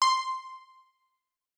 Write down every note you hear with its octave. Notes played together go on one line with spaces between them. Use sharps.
C6